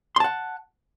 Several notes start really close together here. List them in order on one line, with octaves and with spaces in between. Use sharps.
C6 A5 F#5